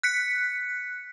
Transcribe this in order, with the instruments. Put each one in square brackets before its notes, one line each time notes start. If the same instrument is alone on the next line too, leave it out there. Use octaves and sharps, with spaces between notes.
[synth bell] F#6 B6 C#7